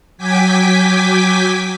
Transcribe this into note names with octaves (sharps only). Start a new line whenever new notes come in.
F#3 G5 G#5 D6 B6